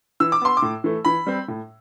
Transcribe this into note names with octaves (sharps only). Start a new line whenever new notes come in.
E3 E6
D6
B3 C6
D6
A2
E3 A3
E3 B5
G3 C4
A2